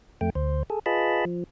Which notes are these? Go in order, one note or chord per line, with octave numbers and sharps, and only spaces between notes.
F2 A3 G5
D2 C5
G#4 A4
F4 G#4 B4 D#5 A5 B5
F3